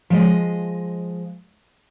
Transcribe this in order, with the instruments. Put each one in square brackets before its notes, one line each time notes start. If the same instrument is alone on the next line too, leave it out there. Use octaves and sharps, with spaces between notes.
[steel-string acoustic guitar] F3 G#3 D#5